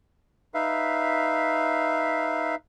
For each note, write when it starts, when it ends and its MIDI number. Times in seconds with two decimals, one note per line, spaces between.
0.54 2.55 63
0.54 2.55 71
0.54 2.55 76
0.54 2.55 77